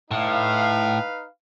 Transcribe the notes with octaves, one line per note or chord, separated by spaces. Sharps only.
A2 D#4 B4 F5